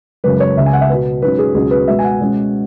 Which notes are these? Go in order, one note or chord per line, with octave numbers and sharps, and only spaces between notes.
F#2 C#3 G#3 B4
C#5
C#2 C#3 G#3 E5
G#5
F#5
E5
B2 B3 B4
G#2 F#3 C#4 B4
G#4
C#2 B2 F#3 C#4 G#4
B4
B2 G#3 B3 E5
G#5
F#5
B2 G#3 C#4